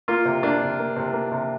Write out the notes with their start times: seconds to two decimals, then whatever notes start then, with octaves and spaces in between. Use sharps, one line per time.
0.08 A#3 F4
0.25 C3
0.43 A#3 D4
0.62 C3
0.79 A#3
0.96 C3
1.13 A#3
1.32 C3